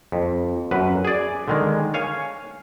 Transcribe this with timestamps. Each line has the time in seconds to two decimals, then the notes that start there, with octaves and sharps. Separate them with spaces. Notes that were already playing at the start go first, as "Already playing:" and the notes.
0.12 F2
0.71 F#2 B4
1.05 G#4 D5
1.48 D3 D#3 G#3
1.94 C#5 F5 G#5